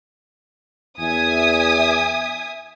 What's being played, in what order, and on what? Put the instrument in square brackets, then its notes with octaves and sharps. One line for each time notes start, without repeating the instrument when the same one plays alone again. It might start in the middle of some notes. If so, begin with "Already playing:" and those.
[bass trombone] E2 [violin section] E5 G#5 D#6